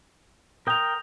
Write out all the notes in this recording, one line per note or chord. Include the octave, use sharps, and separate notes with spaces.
A#4 G5 D#6 F7